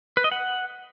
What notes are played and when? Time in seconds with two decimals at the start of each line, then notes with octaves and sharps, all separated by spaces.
0.17 B4
0.24 D#5
0.32 F#5